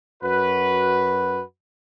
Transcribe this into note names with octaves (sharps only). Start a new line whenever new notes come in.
F#2 F#4 B4